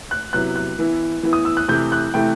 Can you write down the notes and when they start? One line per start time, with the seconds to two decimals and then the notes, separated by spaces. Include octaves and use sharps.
0.11 F#6
0.33 C3 F#3 B3 E4 F#6
0.56 F#6
0.79 E3 B3 E4
1.23 E3 B3 E4
1.33 D#6
1.45 E6
1.57 F#6
1.68 C3 E3 A3 E4 G6
1.92 F#6
2.14 C3 E3 A3 E4 G5